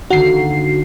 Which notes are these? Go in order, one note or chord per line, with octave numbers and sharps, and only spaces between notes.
D3 D#3 A#3 F#4 C7